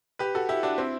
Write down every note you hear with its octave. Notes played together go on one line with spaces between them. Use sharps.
G4 B4
F#4 A4
E4 G4
D4 F#4
C4 E4